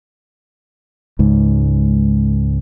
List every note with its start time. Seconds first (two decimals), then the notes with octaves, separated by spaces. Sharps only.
1.19 C#2 G#2